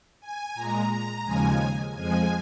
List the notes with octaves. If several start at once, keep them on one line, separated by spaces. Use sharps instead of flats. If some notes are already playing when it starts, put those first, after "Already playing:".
G#5
A#2 G#3 A#5
A#5
D#2 C#3 F3 G#3 G#5
F2 F3 G#3 G#5